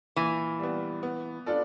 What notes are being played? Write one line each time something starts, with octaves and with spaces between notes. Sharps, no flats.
A#2 E3
G3 B3
B3
D4 F4 A4 D5